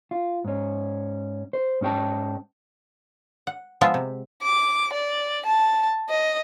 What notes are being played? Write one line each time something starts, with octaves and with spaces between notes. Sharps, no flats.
F4
G#2 C#4
C5
G#2 C#4 F4 G5 A5
F#5
F3 G#3 B3 F4 E5 A5
C3
D6
D5
A5
D#5